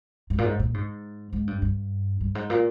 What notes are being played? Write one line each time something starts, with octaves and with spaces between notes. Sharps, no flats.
G#2
A#2
G#2
A#2
G#2
G#2
G2
G2
G2
G#2
A#2